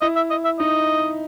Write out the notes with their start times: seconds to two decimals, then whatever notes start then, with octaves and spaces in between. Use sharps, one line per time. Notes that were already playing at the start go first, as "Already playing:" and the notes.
0.01 E4 D#5
0.16 E5
0.30 D#5
0.45 E5
0.59 D#4 D#5